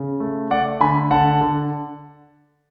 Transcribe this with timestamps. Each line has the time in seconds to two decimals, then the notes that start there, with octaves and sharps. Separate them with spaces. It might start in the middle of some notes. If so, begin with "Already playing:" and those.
Already playing: C#3
0.20 A3
0.50 A3 D5 F#5
0.81 D3 G#5 B5
1.11 D3 F#5 A5
1.41 D3